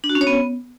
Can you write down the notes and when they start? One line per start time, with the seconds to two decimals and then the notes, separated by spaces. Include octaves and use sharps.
0.04 D4
0.09 F#4
0.15 C#4
0.21 C#5
0.27 B3